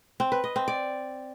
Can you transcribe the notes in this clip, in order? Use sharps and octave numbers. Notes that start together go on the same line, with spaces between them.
C4
B4
D#5
C4
D5